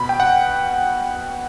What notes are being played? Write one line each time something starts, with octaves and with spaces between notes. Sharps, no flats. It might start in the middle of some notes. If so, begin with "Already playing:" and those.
Already playing: B2 B5
G5
F#5